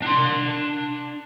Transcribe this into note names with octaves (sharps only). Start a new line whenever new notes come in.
D4 C6